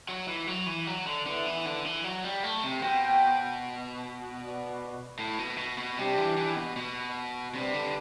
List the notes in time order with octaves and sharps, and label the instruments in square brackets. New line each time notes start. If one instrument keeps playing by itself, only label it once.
[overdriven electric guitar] F#3
E3
F#3
E3
F#3
D3
[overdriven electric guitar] D3 [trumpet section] B3 E4 B4 E5
[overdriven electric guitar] E3
D3
E3
F#3
G3
A3
C3
[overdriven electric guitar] B2 [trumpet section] F#4 C5 G5
[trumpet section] F#4 B4 D5
[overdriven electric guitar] A2
B2
B2
B2
[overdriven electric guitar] C3 [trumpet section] G3 D4 G4
[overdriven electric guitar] E3
E3
B2
B2
[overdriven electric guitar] C3 [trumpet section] G3 D4 G4 B4 D5
[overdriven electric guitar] D3